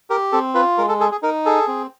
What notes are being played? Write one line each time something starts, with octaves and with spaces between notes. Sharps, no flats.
G4 A#4
C4 A4
F4 B4
G#3 A#4
A4
G#4 A4
G#4
D#4 A#4
G#4 A4
C4